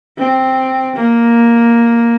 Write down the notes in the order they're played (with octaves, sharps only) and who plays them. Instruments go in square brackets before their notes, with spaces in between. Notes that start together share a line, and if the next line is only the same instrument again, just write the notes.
[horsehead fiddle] C4
A#3